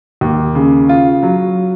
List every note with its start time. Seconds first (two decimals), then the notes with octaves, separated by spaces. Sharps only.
0.21 D#2
0.55 C#3
0.89 F4
1.23 F#3